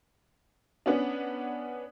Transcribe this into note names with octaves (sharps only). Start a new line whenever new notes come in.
B3 C#4 D4